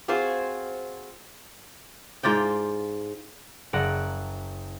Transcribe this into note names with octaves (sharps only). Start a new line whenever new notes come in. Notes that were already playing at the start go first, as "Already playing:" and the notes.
C4 F4 F#4 G#4 C5
G#2 F4 D5 G5
F#1 D5 F#5 A#5 E6